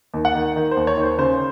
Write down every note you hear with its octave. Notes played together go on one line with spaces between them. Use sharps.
D#2
F#5
D#3
D#3
C5
D#2
C#5
D#3
C5
C#3 C5